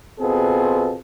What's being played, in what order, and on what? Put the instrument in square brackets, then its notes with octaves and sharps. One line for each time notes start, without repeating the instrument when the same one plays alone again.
[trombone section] B2 B3 C4 F4 G#4 A4